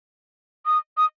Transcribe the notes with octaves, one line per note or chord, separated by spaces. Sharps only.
D#6
D#6